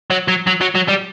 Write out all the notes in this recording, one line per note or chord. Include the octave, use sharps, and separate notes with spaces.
F#3
F#3
F#3
F#3
F#3
G3